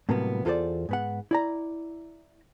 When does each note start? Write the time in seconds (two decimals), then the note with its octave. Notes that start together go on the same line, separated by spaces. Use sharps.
0.09 A2 C3 F#3 G3 A#3 B3
0.45 E2 F4 A4 A#4 C5 D5
0.89 G#2 B3 F#5
1.31 E4 D5 A#5